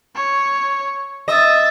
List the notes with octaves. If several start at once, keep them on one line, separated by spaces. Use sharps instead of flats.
C#5
D#5 E5 A6